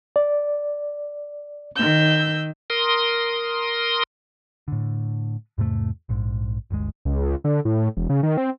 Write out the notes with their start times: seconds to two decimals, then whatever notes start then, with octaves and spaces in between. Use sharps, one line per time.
0.16 D5
1.75 D#3 E6 G6
2.70 A#4 C6 D#6
4.68 A2 D3
5.58 E2 G#2 C3 A3
6.09 A#1 G#2
6.70 G1 D2 G#3
7.05 C#2
7.44 D3
7.65 A2
7.97 E1
8.09 C#3
8.23 D#3
8.37 C4